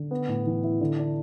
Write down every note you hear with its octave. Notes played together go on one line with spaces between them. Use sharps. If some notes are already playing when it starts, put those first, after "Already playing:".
Already playing: D3
B3
A2
E3
E4
D3
D4